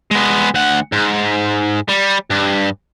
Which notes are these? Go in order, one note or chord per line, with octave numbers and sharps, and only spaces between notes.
G#3 B3
D2 F#5
G#2
G3
G2